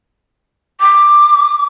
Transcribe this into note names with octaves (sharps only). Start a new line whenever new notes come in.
D6